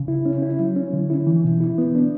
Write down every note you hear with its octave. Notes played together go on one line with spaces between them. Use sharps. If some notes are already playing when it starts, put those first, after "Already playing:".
Already playing: C#3
E4
C#4
E4
F#3
C#4
D3
E4
E3
B2
E4
B3
D4